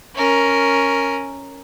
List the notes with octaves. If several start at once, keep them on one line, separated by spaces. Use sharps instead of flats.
C#4 A#4